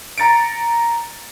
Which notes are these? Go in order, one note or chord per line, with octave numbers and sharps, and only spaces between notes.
A#5 A6 C#7 D7